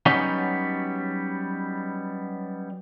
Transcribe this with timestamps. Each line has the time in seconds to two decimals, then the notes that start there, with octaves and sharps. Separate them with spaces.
0.06 F#3 G3 B3 C#4 D#4